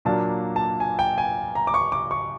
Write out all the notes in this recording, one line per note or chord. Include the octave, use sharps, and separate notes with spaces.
A#2 F#3 A#3 D4 A5
A5
G#5
G5
G#5
A#5
D6
C#6
D6
C#6